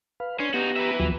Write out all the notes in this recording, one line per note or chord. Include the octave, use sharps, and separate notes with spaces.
B4 F5
C#4 D4 C6
B3 D#4 F#4 G4 A#5
B4 E5
D#2 F3 F#3